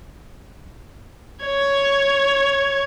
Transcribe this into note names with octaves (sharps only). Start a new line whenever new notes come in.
C#5 G#6